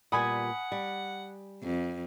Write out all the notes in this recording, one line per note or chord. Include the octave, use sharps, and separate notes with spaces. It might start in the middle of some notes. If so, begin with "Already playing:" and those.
A#2 G3 B3 F#5 G#5 B5 D#6
G3
F2